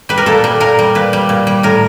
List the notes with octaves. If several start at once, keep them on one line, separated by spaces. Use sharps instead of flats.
G3 B4
A#4
A#2 A4
G3
A#2 A#4
G3
A#2 B4
G3
A#2
G3
A2 A#4